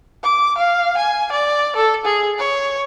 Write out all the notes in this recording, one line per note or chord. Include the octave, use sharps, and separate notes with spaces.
D6
F5
G#5
D5
A4
G#4
C#5